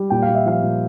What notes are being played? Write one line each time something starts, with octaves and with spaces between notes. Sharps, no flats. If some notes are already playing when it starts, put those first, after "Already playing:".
Already playing: G3
A#2 G5
F5
A#2
E5
F3 F5
A#2